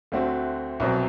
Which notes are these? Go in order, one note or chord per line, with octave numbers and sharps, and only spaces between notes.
D2 D3 A3 C4 F#4
C2 B2 F#3 C4